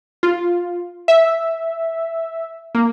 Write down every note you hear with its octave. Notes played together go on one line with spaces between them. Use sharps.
F4
E5
A#3